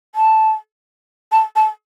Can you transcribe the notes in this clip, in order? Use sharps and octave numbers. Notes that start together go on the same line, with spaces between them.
A5
A5
A5